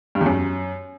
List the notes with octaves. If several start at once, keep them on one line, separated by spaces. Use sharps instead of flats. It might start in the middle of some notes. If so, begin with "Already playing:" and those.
G2
E2
F#2